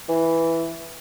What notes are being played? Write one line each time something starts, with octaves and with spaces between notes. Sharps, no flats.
E3